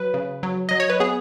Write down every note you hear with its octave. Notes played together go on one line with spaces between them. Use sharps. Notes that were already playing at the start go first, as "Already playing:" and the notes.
Already playing: F#3 B4
C#3
F#3
F#3 D#5
C#5
B4
B3 G#4